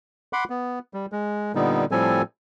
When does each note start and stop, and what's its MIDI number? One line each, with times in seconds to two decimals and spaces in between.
0.33 0.44 78
0.33 0.44 83
0.33 0.44 84
0.33 0.44 86
0.50 0.79 59
0.94 1.06 55
1.12 1.52 56
1.55 1.85 46
1.55 1.85 50
1.55 1.85 55
1.55 1.85 59
1.55 1.85 63
1.91 2.22 45
1.91 2.22 53
1.91 2.22 55
1.91 2.22 60
1.91 2.22 69
1.91 2.22 80